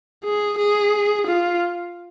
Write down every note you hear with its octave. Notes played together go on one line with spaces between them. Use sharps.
G#4
G#4
F4